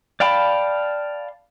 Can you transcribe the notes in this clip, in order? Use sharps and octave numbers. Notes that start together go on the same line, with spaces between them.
D5 F5 G5 A5 B5